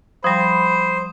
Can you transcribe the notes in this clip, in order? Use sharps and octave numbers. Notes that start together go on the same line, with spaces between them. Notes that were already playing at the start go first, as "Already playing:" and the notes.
F3 G3 C5 B5 D#6